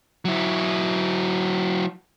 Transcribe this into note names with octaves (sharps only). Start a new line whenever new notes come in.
F#3 E4